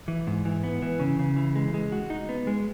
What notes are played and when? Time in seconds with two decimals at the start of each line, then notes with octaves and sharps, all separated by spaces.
0.08 E3
0.27 G#2
0.45 E3
0.64 B3
0.82 E3
1.00 C#3
1.19 C#3
1.36 E3
1.55 G#3
1.74 G#3
1.92 F#4
2.10 D#4
2.29 B3
2.47 G#3